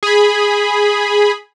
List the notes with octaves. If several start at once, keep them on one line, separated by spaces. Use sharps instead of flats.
G#4 B5